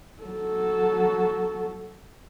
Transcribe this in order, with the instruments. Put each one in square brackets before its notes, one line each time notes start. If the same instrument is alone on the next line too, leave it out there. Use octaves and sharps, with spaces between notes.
[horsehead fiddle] F#3 A4